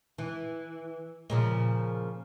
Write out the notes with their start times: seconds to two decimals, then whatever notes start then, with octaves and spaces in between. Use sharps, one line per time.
0.18 E3
1.30 A#2 C#3 F3